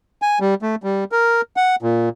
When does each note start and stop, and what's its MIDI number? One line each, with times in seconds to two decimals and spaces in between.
0.22 0.39 80
0.41 0.54 55
0.62 0.75 57
0.83 1.04 55
1.12 1.41 70
1.57 1.76 78
1.83 2.09 46